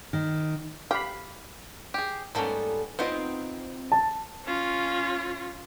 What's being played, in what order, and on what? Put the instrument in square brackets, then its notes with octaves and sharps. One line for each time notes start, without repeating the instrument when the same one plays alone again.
[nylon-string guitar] D#3
[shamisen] G4 [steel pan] F5 B5
[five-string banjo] G4 G#4
[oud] G#2 G3 A4 [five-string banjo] A#3 B3 C#4
[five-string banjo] B3 C5 D#5 [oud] C4 D#4 F4
[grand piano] A5
[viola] C#4 F4